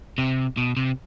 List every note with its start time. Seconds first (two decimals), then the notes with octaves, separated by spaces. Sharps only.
0.18 C3
0.57 B2
0.77 C3